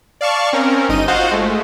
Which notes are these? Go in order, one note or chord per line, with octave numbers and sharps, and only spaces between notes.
D5 F5 A5 C#6
C4 C#4 A#4
G1 D#4 D#5 D#7
F4 F#4 C5 D#5 F5 F#5
G#3 A3